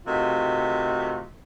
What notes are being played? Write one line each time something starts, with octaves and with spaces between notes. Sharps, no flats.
C3 D#3 A3 F4 F#4